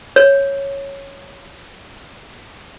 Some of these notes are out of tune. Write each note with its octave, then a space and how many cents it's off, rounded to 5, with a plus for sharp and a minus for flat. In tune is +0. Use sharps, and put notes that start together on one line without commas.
C#5 -5